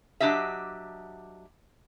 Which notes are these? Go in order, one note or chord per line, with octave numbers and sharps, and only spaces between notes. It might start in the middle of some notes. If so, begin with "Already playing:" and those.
F#3 B3 D4 G4 D#5 E5